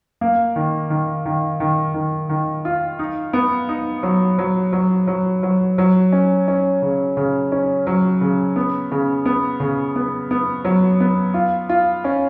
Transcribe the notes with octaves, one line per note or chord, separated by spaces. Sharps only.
A#3
D#3
D#3
D#3
D#3
D#3
D#3
F4
D#4
B3
D#4
F#3
F#3
F#3
F#3
F#3
F#3
C#4
C#4
C#3
C#3
C#4
F#3
C#3
B3
C#3
B3
C#3
B3
B3
F#3
B3
F4
F4
C#4